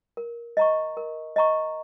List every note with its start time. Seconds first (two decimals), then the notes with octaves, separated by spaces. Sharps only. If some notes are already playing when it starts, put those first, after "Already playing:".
0.17 A#4
0.57 D#5 A#5 C#6
0.97 A#4
1.36 D#5 A#5 C#6